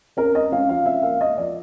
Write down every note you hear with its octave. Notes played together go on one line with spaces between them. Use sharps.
C#4 A#4
C#4 D#5
C#4 F5
F3 F5
C#4 E5
A#3 F5
A#3 D#5
F3 D5